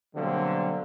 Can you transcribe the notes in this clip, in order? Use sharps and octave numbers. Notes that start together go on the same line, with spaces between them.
B2 D3 F#3 G3 A#3 C4